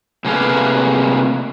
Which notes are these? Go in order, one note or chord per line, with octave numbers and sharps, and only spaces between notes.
C3 A3 A#3 G#4 B4 F5